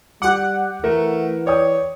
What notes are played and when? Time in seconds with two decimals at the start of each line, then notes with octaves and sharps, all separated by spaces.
0.22 G3 G4 F#5 D6
0.84 E3 A3 A#4
1.47 C#5 D5 G5 D#6